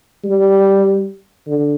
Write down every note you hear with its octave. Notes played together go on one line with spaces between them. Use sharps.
G3
D3